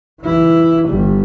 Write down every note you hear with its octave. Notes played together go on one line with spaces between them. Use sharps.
E3 E4
G1 G3